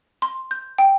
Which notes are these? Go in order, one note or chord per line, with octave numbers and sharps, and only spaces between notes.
C6
G6
G5